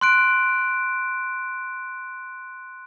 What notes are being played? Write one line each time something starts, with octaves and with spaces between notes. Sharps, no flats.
C6 F#6 D7